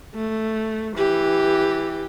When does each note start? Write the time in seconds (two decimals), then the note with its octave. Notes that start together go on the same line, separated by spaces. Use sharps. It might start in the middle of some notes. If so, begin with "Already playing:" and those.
0.15 A3
0.96 E3 G4